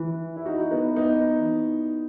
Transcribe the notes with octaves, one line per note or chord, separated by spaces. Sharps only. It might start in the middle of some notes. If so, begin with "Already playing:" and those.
Already playing: E3
E4
D#4 F#4
B3 D#4
B3 D#4